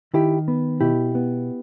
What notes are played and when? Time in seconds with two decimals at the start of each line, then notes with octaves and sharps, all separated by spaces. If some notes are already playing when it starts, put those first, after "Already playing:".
0.14 D#3 E4 G4
0.48 B3
0.81 B2 E4 G4
1.15 B3